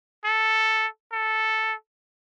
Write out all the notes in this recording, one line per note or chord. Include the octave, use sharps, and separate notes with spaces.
A4
A4